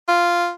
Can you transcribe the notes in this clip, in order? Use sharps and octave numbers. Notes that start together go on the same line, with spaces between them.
F4